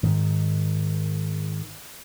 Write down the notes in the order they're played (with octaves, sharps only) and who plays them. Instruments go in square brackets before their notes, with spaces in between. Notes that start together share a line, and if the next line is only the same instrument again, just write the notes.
[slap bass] G#2 D#3